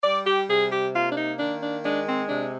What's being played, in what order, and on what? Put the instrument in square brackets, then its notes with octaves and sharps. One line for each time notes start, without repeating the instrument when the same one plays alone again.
[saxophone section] G3 D5
G4
C3 G#4
G4
A#3 F4
D4
D#4
D#3 D4
D4
G#3 D4
C4
C3 D4